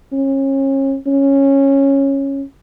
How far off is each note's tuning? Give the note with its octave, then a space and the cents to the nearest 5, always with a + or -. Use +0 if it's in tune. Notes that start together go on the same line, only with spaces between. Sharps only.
C#4 -35
C#4 -10